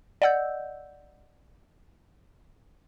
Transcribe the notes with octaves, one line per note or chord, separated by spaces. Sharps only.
D5 D#5 F#5 E6 G6